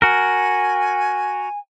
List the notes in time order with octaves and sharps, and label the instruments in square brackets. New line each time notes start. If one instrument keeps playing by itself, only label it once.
[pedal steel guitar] F#4 A#4 [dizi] G#5